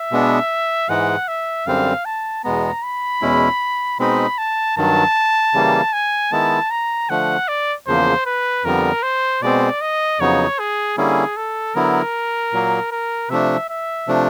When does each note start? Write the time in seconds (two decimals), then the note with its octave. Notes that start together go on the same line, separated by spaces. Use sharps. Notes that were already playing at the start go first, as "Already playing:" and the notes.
Already playing: E5
0.12 B2 G#3 B3 D4
0.89 G#2 E3 G#3 F#5
1.28 E5
1.67 F#2 D3 G3 C4 F5
2.05 A5
2.44 E2 B2 G#3 B3 A#5
2.83 B5
3.22 E2 B2 G#3 C#4 E4
3.99 B2 G#3 C4 D#4 B5
4.38 A5
4.77 G2 D#3 F#3 A5
5.54 C#3 E3 G3 A#3
5.93 G#5
6.31 D#3 G#3 B3 E4 A5
6.71 A#5
7.09 D3 F3 A3 F#5
7.48 D5
7.87 E2 C#3 F3 A#3 C5
8.26 B4
8.64 F2 D3 G3 B3 A#4
9.03 C5
9.42 B2 G#3 C4 D5
9.81 D#5
10.20 F2 C#3 F#3 B3 D#4 C#5
10.59 G#4
10.97 D3 G3 A#3 C#4 E4 G#4
11.37 A4
11.75 D3 F#3 B3 E4 A#4
12.53 A#2 F#3 A#3
12.91 A#4
13.29 C3 F3 A3 D4 E5
13.69 E5
14.08 C3 F3 A3 D4